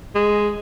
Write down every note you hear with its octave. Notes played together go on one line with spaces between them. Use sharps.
G#3